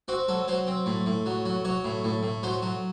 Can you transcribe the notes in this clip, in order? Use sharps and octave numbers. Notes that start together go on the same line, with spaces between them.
C4 F#4
F#3 A4
F#3 C5
C4
A2
A2
F#3
F#3
F#3 C#5
A2
A2
A2
F#3 C5
F#3